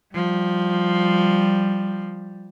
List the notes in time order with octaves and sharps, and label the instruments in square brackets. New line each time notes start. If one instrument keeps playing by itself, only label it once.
[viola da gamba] F3 [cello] G3